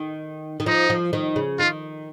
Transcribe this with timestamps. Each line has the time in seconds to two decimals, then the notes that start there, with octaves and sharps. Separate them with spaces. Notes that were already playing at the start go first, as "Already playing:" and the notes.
Already playing: D#3
0.60 D#3
0.66 F3 D#4
0.90 F3
1.13 D#3
1.36 C#3
1.59 D#3 F4